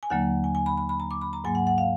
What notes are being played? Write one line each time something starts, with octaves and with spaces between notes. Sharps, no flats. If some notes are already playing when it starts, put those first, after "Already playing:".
G#5
D#2 D3 F#3 A#3 F#5
G#5
G#5
B5
B5
B5
A#5
D6
B5
A#5
G#2 F#3 A#3 G#5
F#5
F#5
F5